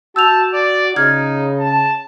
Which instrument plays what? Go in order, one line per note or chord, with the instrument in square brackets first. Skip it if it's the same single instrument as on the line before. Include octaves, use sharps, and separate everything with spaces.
[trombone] F#4 [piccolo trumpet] A5 [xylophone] E6 G6 F7
[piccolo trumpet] D5
[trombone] C#3 [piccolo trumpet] D#4 [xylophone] F6 G#6
[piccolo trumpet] A5